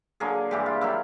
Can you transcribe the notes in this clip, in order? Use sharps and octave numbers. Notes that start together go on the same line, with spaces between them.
D3 F#3 A#3 G#4
G2 E3 G#3 G4
F4
D#3 F#3 A#3 E4